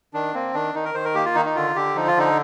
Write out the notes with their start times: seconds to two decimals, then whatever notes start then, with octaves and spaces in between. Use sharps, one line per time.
0.14 D#3 D4
0.34 A#3 C4
0.54 D#3 D4
0.74 D#3 D#4
0.85 A#4
0.95 D#3 C5
1.05 A#4
1.15 A#3 G4
1.25 F4
1.35 D#3 D#4
1.46 D#4
1.56 D3 F4
1.76 D3 G4
1.95 F3 D#4
2.07 F4
2.17 D3 D#4